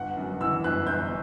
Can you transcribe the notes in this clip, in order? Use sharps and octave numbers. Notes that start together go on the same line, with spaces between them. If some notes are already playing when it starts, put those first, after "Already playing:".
Already playing: G1 F#5
F#2
E3 E6
G1 F#6
G1 G6